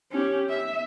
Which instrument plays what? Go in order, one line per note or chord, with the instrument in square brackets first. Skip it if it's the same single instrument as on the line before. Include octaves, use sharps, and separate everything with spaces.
[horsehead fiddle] C#4 G4
E5